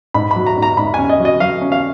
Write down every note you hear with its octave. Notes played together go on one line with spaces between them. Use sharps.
G#2 B5
B5
F#3
A#5
G#2
A#5
G#2 B5
C#4 G#5
D#5
F#3
D#5
F#3 F5
C#4
F5